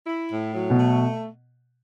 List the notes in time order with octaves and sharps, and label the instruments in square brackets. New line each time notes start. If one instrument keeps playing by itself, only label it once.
[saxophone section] E4
A2
F#3
[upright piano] B2
[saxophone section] A3